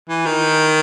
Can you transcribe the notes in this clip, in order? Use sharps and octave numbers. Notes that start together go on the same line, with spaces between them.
E3
D#3